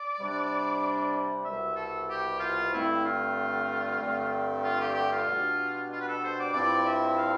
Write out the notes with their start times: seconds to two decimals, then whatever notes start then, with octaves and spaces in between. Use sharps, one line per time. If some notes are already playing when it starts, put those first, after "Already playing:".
Already playing: D5
0.18 C3 G3 D4
1.45 C2 B2 G3 E5
1.76 A4
2.08 G4
2.40 F4
2.72 G2 D3 A3 C4 E4
3.03 F4
3.99 G2 D3 A3 C4
4.62 F4
4.79 G4
4.95 G4
5.11 F4
5.27 B2 G3 D4
5.90 F4
6.00 B4
6.06 A4
6.23 C5
6.38 D5
6.54 G2 F3 C4 E4 D5
6.86 E5
7.18 F5